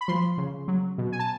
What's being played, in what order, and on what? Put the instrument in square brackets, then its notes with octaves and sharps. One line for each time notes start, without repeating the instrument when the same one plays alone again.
[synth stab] B5
F3 C6
C#3
F#3
B2
G#5
A5